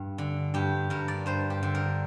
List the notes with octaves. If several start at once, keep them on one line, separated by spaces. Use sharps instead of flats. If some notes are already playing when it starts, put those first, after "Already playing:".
Already playing: G2
D3
G2 G4
G2 A#4
D5
G2 C5
G4
D3
A#4